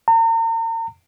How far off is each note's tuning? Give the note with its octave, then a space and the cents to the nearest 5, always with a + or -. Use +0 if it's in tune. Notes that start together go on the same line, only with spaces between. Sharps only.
A#5 -40